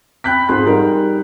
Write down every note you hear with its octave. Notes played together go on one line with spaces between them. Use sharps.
G5 B5 F#6 G6 B6
G#2 C4 F4 G#4 C6 F#6
G3 D#4 A#4